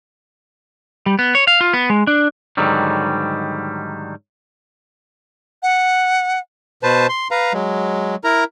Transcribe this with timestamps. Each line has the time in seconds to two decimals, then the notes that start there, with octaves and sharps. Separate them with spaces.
1.06 G3
1.19 B3
1.35 C#5
1.47 F5
1.61 F4
1.74 B3
1.90 G#3
2.07 D4
2.57 G#2 D3 D#3 F#3 G3
5.63 F#5
6.83 B2 B4 C5 A5
7.09 C6
7.31 B4 F5 A#5
7.53 F#3 G#3
8.24 E4 A#4 A#5